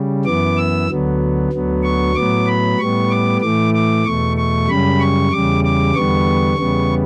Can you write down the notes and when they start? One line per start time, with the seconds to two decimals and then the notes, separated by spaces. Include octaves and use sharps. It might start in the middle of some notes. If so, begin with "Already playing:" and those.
Already playing: C#3 G3
0.25 F#2 E3 B3 D6
0.57 E6
0.88 D2 D3 F#3 B3
1.52 D2 D3 F#3 B3
1.83 C#6
2.15 A2 F#3 B3 D6
2.47 B5
2.79 A2 G3 B3 C#6
3.10 D6
3.41 A2 E3 A3 D6
3.74 D6
4.05 E2 B2 A3 C#6
4.37 C#6
4.68 F#2 C#3 G3 B5
5.00 C#6
5.32 E2 C#3 G3 D6
5.64 D6
5.95 E2 D3 G3 B3 C#6
6.58 E2 C#3 G3 B3